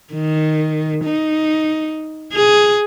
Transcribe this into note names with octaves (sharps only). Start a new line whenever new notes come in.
D#3
D#4
G#4